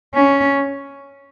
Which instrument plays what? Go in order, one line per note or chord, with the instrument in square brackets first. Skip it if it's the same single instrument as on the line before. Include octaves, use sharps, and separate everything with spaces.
[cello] C#4